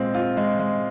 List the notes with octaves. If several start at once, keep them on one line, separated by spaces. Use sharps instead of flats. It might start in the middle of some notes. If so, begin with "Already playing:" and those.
Already playing: A#2 G#3 C4 F4
F4
G#3
G#3